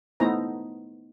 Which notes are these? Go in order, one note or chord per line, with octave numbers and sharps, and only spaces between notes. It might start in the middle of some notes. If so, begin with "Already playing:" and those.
A3 B3 D#4 E4 C5 A#5